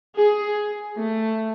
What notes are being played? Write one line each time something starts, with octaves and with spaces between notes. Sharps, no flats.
G#4
A3